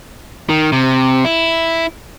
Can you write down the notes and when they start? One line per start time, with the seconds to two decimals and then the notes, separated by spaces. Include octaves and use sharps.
0.49 D#3
0.72 C3
1.25 E4